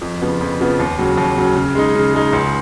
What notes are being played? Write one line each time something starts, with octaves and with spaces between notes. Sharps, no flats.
F2
C#3 F3 B3
F2
C#3 F3 B3
D#2
C#3 F#3
D#2
C#3 F#3
C#3
G#3 D#4
C#3
G#3 D#4
C#2